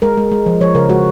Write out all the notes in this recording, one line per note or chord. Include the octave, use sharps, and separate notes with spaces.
G#3 A#4
G#3
G#3
F3
F3 C#5
C#3 A#4
G#3 F#4